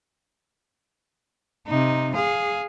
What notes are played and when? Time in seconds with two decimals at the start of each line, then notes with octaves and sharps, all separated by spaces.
1.67 C3 D#4
2.15 G#4 F5